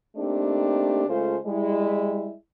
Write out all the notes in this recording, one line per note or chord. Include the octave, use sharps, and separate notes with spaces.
A3 A#3 C4 D4 D#4 G4
C#3 G#3 A3 F4 A4 C5
G3 G#3 E4